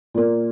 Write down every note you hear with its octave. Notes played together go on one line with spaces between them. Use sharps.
A#2 A#3